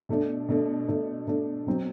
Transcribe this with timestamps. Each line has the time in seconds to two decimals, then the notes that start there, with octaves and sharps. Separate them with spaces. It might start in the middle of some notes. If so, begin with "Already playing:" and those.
0.09 B2 A3 D4
0.49 B2 A3 D4
0.88 B2 A3 D4
1.27 B2 A3 D4
1.67 B2 F#3 C4